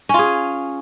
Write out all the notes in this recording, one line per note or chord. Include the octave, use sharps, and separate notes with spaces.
C#4 F4 G#4